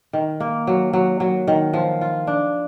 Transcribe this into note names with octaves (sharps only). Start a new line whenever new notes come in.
D#3
A#3
F#3
F#3
F#3
D#3
F3
F4
D4